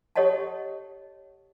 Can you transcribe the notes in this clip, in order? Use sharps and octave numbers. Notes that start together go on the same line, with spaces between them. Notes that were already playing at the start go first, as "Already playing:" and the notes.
G4 A4 C#5 D#5 F#5 A5